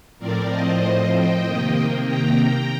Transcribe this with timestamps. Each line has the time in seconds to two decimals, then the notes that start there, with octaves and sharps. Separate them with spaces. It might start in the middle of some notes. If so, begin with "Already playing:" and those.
0.19 A2 F3 C4 A#4 D5
0.50 C5 D#5
1.13 D#5 G5
1.44 C3 D#3 A#3
2.07 G5 A#5